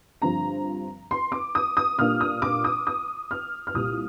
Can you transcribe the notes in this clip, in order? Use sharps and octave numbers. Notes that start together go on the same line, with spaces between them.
G2 D3 F3 C4 A#5
C6
D6
D#6
D#6
A#2 G3 A#3 D4 F6
D#6
D6
D#6
D#6
F6
F6
C2 A#2 G3 D#6